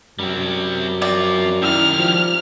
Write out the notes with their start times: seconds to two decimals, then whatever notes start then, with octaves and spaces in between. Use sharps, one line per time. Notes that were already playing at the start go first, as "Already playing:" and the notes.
0.19 F#2 G3 C4
1.02 C4 F4 D5
1.62 D#3 G3 E4 F6
1.97 F3